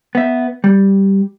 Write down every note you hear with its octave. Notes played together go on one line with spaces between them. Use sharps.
B3 E5
G3